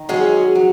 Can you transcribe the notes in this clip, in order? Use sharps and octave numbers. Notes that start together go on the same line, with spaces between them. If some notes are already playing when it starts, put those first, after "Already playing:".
Already playing: D#3
F#3 G#3 C#4 G#4
F#3